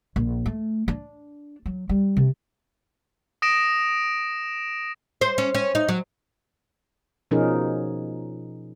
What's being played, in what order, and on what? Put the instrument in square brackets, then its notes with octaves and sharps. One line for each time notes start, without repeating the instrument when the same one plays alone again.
[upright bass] A#1
A3
D4
F#3
G3
C3
[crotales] D#6 A#6 D7 E7
[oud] C5
C#4
C#4
D#4
F#3
[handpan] B2 F3 C#4 D#4 G#4 A#4